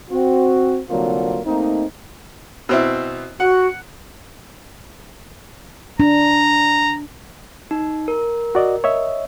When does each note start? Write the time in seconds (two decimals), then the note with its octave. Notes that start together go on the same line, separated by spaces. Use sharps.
0.10 C4 F#4
0.90 C2 D3 F#3 A#3 C4 F4
1.45 A3 A#3 C4 D#4
2.69 B2 C4 E4
3.40 F#4 F#5
6.00 D4 A#5
7.71 D#4
8.08 A#4
8.55 F#4 D5 D#5
8.84 C#5 D#5 E5